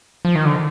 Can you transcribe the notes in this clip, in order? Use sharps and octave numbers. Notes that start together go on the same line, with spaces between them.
F3
D#3
D3